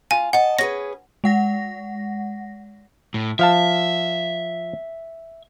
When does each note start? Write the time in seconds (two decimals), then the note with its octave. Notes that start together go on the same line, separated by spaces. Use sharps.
0.11 F4 G#5
0.33 D#5 F#5 A5
0.59 C#4 G#4 B4 A#6
1.24 G#3 F#5 A#6
3.14 A2
3.39 F3 E5 F5 A5